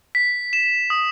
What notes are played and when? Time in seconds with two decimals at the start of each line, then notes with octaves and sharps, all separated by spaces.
0.15 B6
0.53 E7
0.90 D#6